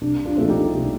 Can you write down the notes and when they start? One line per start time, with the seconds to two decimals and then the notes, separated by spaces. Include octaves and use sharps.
0.01 C2 D4
0.25 D4 F4
0.37 A#2 F3 A3 C4 A4
0.48 D#4 G4
0.73 C2